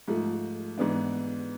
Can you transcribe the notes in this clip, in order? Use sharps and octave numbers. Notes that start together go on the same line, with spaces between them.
G#2 F3 A3
G#2 E3 B3 D4